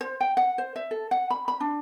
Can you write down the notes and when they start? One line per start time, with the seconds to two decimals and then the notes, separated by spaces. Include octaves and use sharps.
0.01 C5
0.21 G5
0.37 F#5
0.58 C5
0.76 E5
0.91 A4
1.11 F#5
1.30 B5
1.48 B5
1.60 D4